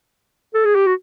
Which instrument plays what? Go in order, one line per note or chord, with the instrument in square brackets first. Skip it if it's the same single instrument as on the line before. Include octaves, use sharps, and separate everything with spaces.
[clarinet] A4
G#4
G4
F#4